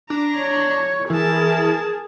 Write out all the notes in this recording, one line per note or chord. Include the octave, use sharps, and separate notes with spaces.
D4 A#5
C#5
E3 G#4 A#4 A5